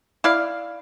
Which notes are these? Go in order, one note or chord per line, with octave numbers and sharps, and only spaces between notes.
E4 D5 F5